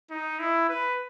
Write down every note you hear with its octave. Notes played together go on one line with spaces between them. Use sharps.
D#4
E4
B4